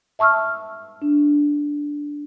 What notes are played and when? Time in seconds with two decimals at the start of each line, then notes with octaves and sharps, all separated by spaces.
0.19 E5 A5 C#6 E6 F6
1.02 D4